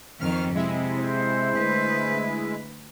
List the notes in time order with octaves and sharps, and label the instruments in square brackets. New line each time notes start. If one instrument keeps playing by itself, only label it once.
[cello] F2 D#3 [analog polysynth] F6
[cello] C3 [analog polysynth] G#3 E4
[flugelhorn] C5
[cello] D2 B4